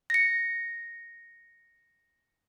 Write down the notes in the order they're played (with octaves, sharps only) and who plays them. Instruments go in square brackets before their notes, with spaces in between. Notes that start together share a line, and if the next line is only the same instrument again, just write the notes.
[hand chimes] A#6 C#7